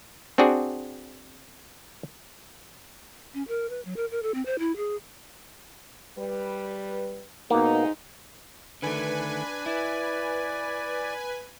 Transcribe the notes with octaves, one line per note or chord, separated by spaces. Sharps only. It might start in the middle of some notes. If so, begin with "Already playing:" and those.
C4 D4 F#4 G#4 D5
C#4
A#4
B4
F#3
A#4
A#4
A4
C4
C5
E4
G#4
G3 B4
G#2 B2 A#3 D#4
D3 D#3 A3 D4 B4 G#5
E4 D5